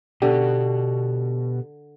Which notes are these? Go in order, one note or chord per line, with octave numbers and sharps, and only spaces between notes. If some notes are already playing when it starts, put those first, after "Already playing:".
B2 D3 G4